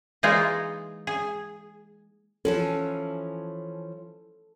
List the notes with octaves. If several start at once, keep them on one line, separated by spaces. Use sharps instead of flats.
E3 G#3 A#3 D#4 F4 G#4
G#4
E3 F3 C#4 A4